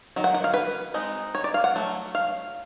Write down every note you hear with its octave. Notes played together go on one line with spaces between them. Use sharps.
D#3 F#3
F#5
F#5
F5
B4
G#3 C4 D#4
C#5
D5
F5
F#5
F#3 A3
F5